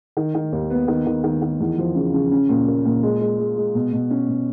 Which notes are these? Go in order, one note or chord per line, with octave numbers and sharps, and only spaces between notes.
D#3
D#3
D#2
B3
D#3
D#3
D#3
D#3
E2
F3
C#3
C#3
C#4
A#2
A#3
A#2
G#3
G#3
G#3
G#3
B2
B2
C#4
B2